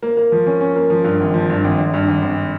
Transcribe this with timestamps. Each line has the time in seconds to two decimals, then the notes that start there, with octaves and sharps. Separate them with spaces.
0.03 A#3
0.17 A#3
0.32 F3
0.47 C#4
0.61 C#4
0.76 A#3
0.90 F3
1.04 G2
1.20 G#1
1.34 F3
1.50 G2
1.64 G#1
1.79 G#1
1.94 G2
2.08 G#1
2.22 G#1